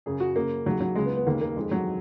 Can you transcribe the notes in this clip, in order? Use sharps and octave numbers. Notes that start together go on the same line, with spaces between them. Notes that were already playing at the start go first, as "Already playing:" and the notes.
F#2 C#3 G#4
F#4
F#2 C#3 A#3
D#2 C#3 F#3
F#3
C#2 C#3 G#3
B3
B3
D#2 C#3 A#3
A#3
F2 D#3 G#3
F#3